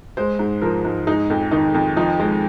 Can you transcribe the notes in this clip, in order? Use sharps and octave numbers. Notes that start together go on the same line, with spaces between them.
G#3 C5
G#2
F3 A#4
G#2
G#3 D#4
F2
D#3 D#4
F2
F3 D#4
G#3